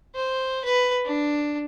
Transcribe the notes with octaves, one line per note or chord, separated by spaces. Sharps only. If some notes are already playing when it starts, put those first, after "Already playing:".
C5
B4
D4